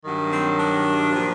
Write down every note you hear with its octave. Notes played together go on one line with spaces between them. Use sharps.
G2 D#3 F#3
C4
D4
A#2 F3